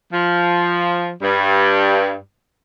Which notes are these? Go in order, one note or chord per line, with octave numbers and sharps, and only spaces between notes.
F3
G2